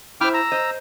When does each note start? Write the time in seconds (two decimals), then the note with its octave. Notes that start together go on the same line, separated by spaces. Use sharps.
0.21 E4 C5 G5 D6 F6
0.34 A#5 E6
0.52 C5 D#5